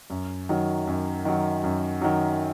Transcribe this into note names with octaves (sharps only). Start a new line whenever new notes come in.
F#2
D#3 F#3
F#2
D#3 F#3
F#2
D#3 F#3